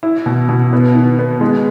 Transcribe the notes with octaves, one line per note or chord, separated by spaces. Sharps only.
E4
B2
B2
B3
D#3
B3
G#3